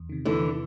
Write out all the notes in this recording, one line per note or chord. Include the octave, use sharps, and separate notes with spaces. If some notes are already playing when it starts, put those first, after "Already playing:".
Already playing: E2
C3 D#3
E2 D3 E3
C3 D#3